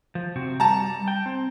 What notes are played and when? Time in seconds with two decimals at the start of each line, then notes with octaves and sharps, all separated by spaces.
0.15 F3
0.36 C3 C4 F#4
0.60 G3 A5 A#5
1.08 G5
1.26 C4